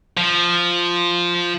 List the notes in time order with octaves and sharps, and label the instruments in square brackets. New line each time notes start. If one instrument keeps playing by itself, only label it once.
[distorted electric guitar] F3